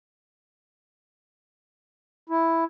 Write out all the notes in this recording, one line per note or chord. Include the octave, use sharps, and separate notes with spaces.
E4